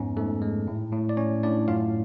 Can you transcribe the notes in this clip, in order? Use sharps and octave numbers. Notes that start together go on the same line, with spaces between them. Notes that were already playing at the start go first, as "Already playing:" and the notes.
Already playing: F2 G#2 B3 C#4
G#2 A3 A4
G#3
A2
A2
D5
C#4 C#5
A2 D4 D5
F#2 F4 F5